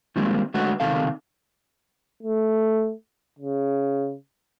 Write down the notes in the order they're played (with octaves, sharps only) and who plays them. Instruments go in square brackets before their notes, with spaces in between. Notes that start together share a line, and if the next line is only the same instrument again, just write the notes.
[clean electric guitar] D#3 F3 G3 G#3 A#3 C4
D3 G#3 A3 F#4 B4 C#5
C#2 C3 D#3 A4 F5
[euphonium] A3
C#3